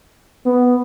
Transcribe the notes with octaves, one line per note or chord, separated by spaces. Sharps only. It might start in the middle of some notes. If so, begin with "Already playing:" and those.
B3